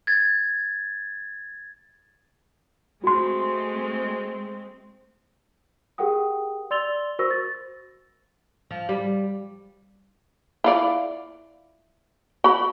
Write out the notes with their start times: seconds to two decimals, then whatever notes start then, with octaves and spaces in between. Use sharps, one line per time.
0.07 G#6 A6
3.04 G#3 A3 C4 F#4 C6
5.98 G4 G#4 A#4 F#5 G5 D#6
6.71 D5 C6 E6 A6 F7 G7
7.19 F#4 A#4 C5 C#6 E6 A#6
7.31 A6
8.71 F3
8.89 G3
10.64 E4 F4 D5
12.44 F#4 B5